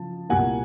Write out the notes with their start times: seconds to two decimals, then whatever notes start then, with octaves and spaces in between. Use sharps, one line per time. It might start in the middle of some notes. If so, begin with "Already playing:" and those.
Already playing: C#3 F3 A5
0.29 C2 A#2 G3 A#3 F#5 G#5